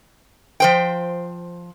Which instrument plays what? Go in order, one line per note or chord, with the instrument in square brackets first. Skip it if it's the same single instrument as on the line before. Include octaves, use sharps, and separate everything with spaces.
[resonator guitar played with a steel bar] F3 C5 G5